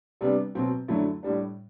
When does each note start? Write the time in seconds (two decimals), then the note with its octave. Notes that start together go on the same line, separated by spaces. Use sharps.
0.21 C3 G3 B3 D4
0.55 B2 F#3 C4
0.88 F#2 D3 F#3 A3 E4
1.23 A2 G3 D4